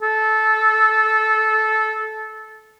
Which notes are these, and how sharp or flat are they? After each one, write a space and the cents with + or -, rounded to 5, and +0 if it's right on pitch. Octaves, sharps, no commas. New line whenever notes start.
A4 -15